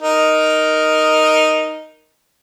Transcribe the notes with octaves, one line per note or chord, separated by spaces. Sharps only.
D#4 A#4